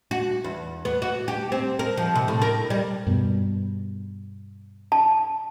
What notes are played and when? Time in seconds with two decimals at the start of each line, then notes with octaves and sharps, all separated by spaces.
0.11 F#4
0.44 E2
0.85 B3
1.02 F#4
1.28 G4
1.52 C4
1.79 A#4
1.97 F3
2.15 C3
2.28 A2
2.42 A#4
2.70 G3
3.07 G2 B2
4.92 A5